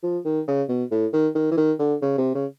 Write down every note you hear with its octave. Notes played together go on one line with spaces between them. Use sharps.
F3
D#3
C#3
B2
A2
D#3
D#3
E3
D#3
D3
C#3
C3
C#3